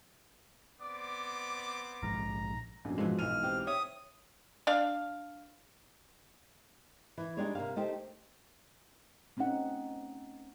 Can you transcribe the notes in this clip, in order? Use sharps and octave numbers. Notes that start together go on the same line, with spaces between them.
B3 C4 D5 D6
A#1 G#2 A#5
A#1 F#2 B2
G#2 B2 E3 F3 G#3
B1 G#2 B2 E3 F6 D#7
C4 G4
C#5 E5 D#6
D4 F5
E3
G3 G#3 D4 D#4 G#4 C#5
C3 A#3 F5
A3 D#4 G4 C5
A3 C4 C#4 D#4 F#5